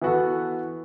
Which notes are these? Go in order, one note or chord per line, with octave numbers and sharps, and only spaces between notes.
E3 B3 F#4 A4